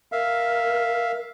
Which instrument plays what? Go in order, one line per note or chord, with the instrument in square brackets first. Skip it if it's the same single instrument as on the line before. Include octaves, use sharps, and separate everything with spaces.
[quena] A#4 [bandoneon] E5 F5